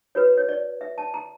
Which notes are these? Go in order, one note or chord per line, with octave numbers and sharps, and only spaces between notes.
F#4 B4 C#5
C#5
D5
E5
A5
A#5